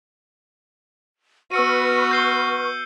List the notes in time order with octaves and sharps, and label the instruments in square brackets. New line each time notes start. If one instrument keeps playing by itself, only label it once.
[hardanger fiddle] B3 F#4 [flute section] B4 C#6 F6 [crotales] E6 C#7 D#7
[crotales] G6 C7 G7